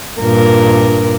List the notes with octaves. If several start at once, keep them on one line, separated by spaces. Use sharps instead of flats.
G2 A#2 A#4